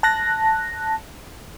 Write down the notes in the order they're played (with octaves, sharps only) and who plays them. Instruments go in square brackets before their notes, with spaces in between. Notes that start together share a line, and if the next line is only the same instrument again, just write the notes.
[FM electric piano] A5 F#6 A#6